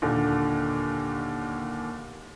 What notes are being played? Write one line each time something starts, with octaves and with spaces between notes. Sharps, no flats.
D#2 A#2 D3